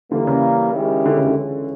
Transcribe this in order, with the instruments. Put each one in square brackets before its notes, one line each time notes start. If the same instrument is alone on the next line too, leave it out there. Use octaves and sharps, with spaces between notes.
[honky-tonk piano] D3 [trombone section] E3 G3 A#3
[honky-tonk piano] C#3
[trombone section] D#3 G#3 C#4 E4 G4
[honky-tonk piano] D3
C#3
D3
[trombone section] C#2 C#3 E3 G#3 C#4